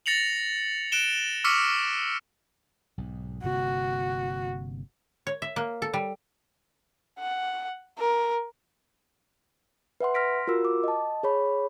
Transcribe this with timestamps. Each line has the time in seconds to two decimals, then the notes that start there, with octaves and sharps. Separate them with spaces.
0.06 A6 A#6 C#7 F7 F#7
0.92 F#6 D7 E7 G7
1.44 C#6 D6 E6 F6 B6 C#7
2.98 B1 G#2
3.43 G1 C3 A#3 F#4
5.27 C#5
5.42 E5
5.56 A#3
5.82 A4
5.93 G3
7.19 F#5
7.98 A#4
10.00 B4 E5 F#5 C6
10.14 C6 F6 A#6 B6 D7
10.47 F4 F#4 A#4 E6
10.65 D6
10.84 D#5 A5
11.23 G#4 C#5 B5